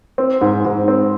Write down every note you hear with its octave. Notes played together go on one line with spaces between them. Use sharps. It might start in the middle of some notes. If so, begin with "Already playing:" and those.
C4
G#2
G#2
C4